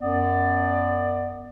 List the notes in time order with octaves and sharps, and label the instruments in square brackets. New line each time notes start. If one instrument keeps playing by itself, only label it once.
[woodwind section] F#2 B3 D5